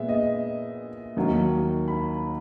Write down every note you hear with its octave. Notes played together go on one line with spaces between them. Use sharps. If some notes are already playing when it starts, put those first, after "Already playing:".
Already playing: A#2 G#3 B3 E5
D#5
D#2 D#3 F#3 A#3
B5